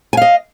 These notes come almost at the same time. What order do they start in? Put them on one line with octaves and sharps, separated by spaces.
G#5 F5 D#5